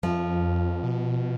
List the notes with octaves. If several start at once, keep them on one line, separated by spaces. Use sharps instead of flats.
F2 F3
B2